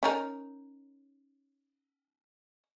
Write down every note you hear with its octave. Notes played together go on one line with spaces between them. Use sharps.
C#4 D#4 A#4